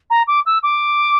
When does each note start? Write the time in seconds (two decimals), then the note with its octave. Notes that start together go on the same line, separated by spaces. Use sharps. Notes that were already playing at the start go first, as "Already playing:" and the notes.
0.10 A#5
0.28 D6
0.46 E6
0.63 D6